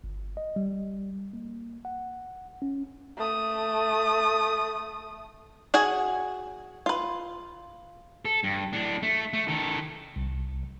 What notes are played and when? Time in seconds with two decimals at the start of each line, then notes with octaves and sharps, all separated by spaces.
0.04 G1
0.37 D#5
0.56 G3
1.33 A#3
1.85 F#5
2.62 C#4
3.18 A3 D#6
5.74 F#4 G#4 F#5 G#5
6.86 F4 B4
8.25 A4
8.44 G2
8.73 A2 D4
9.03 A3
9.33 A3
9.48 D#3 A4
10.16 C2